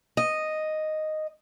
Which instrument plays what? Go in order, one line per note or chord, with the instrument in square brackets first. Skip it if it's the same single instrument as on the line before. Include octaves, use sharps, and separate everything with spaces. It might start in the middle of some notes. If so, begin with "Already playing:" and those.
[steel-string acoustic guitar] D#5